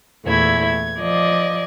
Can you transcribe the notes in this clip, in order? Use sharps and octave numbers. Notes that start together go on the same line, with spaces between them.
E2 A#2 A3 E4 G#6
G#6
F3 D5 D#5 G#6